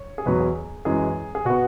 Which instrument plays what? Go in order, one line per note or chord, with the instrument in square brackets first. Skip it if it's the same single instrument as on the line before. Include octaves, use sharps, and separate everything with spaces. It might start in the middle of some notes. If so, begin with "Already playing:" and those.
Already playing: [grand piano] C#5
G#4
E2 B2 F#3 B4
G#4
F#2 E3 G#3 G#4
G#4
B2 B3 F#4